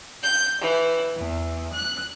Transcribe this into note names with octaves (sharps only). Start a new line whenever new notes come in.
G6
E3
E2
F#6